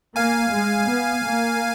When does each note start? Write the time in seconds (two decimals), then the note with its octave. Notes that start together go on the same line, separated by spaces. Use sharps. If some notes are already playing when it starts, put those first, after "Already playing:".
0.16 A#3 F5 G#5
0.52 G#3
0.89 B3
1.25 A#3